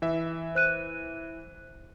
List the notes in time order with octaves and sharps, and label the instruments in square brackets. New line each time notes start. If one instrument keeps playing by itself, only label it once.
[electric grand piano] E3 E5
[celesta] C5 F#6 D#7